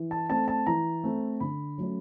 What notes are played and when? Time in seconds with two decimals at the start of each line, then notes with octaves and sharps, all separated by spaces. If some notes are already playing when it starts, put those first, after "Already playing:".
Already playing: E3
0.11 A5
0.30 A3 C4 A5
0.48 A5
0.67 E3 A#5
1.04 A3 C4
1.40 D3 B5
1.78 F#3 A3 C#4